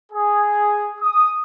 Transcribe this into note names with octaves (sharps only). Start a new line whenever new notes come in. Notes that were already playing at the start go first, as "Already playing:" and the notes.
G#4
D#6